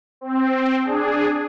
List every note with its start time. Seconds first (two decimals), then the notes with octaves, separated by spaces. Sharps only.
0.21 C4
0.84 D4 G#4